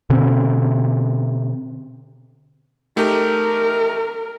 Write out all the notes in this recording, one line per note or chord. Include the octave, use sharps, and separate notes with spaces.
B2 D3 C4 C#4
A3 D#4 G4 A#4